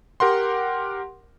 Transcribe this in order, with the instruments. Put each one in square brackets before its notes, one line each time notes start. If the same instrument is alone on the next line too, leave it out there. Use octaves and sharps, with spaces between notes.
[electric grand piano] G4 A#4 F#5 C6